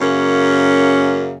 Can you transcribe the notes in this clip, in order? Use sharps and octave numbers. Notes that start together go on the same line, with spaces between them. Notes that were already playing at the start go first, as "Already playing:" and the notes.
F#2 C#3 A#3 C#4